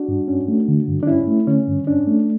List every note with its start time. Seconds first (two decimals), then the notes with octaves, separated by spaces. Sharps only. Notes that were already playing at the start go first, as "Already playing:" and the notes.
Already playing: D4 F#4
0.08 G2
0.28 C#4
0.48 A3
0.68 D3
0.88 G2
1.03 D4
1.07 C#4 E4
1.28 A3
1.47 D3 C#4
1.67 G2
1.87 C#4 D4
2.07 A3